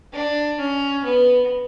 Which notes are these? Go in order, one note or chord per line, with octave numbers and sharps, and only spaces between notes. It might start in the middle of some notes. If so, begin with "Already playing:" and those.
D4
C#4
B3